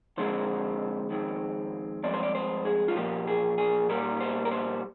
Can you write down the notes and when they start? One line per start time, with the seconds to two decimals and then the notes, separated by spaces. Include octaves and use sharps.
0.17 F2 D3 G#3 C4 C5
1.10 F2 D#3 G#3 C4
2.03 G2 F3 G#3 C4 D5
2.14 C5
2.23 D5
2.35 C5
2.65 G#4
2.88 F4
2.95 A#2 F3 A#3 G4
3.27 G#4
3.58 G#4
3.89 A#2 G3 A#3 A#4
4.20 C5
4.45 A#4
4.51 C5